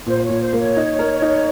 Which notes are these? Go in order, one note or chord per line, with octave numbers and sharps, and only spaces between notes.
A#2 C5
A#2 C#5
C5
A#3
C#5
D#4
A#4
D#4